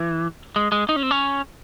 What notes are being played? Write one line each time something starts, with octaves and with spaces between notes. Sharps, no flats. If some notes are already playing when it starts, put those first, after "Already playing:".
Already playing: E3
G#3
G#3
D#4
C#4
C4
C#4